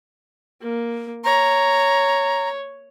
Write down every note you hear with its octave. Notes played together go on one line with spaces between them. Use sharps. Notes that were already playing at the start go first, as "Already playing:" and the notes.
A#3
C#5 A#5